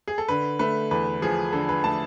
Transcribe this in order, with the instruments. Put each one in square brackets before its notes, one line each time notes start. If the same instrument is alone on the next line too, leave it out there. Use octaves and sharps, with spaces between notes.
[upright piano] G#4
A4
D3 B4
A3 B4
E2 B4
F3 G#4
D3 A4
B4
A3 A5